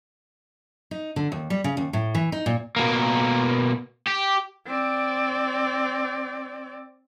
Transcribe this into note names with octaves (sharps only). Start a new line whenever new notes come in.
D#4
D3
D#2
G3
C#3
D#2
A2
E3
D#4
A#2
B2 A#3
G4
C4 D5